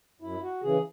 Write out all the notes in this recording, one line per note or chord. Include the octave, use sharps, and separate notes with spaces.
F#2 E4
F#4
C#3 E3 G#4